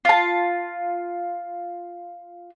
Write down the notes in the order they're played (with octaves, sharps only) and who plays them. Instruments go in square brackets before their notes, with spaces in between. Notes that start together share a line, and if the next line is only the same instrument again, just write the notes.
[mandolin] F4 A5